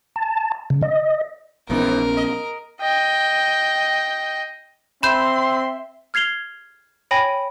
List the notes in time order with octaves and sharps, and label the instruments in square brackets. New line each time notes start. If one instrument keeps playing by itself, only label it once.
[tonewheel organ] A5
C#3
D#5
[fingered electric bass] A#1 B3 C#4 [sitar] G#2 E3 D#4 [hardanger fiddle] A#4
[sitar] D#5
[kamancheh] D#5 G5
[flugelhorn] C4 [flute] E5 [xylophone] B5 G6 [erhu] C6
[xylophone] F6 G#6 C7 F7 G7
C#5 G5 G#5 B5 A#6